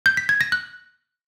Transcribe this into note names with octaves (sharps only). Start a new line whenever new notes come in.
G6
B6
G#6
A#6
F#6